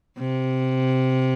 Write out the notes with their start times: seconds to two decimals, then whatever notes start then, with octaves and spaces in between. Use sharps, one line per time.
0.18 C3